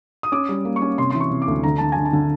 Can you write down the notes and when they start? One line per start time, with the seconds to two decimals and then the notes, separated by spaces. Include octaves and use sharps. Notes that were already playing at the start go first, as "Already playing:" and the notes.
0.23 D#6
0.32 C#4 D6
0.49 G3
0.65 A#3
0.76 C#6
0.82 C#4
0.98 C3 C6
1.11 E3 C6
1.20 C#6
1.31 C3
1.42 D6
1.48 D2
1.63 D3 A#5
1.78 D3 A5
1.92 D3 G#5
2.05 A5
2.13 D3